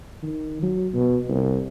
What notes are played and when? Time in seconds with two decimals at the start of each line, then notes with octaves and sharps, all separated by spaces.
0.23 D#3
0.62 F#3
0.94 B2
1.29 C2